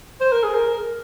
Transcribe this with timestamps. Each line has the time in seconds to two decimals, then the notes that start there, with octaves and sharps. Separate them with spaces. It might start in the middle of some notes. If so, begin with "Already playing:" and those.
0.21 C5
0.32 A#4
0.44 G#4
0.55 A#4